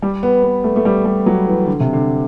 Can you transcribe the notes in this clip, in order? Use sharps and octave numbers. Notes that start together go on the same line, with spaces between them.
G3
B3
B3
A3
A3
G3
G3
F#3
E3
D3
C3
D3